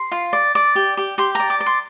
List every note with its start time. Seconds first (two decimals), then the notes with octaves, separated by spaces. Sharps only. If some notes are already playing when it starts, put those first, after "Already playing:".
Already playing: C6
0.12 F4
0.33 D5
0.55 D5 D6
0.75 G4
0.97 G4
1.18 G4 C6
1.35 D5 A#5
1.50 D6
1.60 D5
1.66 C6